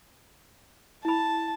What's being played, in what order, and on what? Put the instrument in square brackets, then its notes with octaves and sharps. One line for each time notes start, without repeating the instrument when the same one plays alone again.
[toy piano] E4 B5 [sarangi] A5